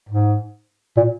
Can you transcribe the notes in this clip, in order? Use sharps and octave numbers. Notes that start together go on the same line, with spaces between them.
G#2
A#2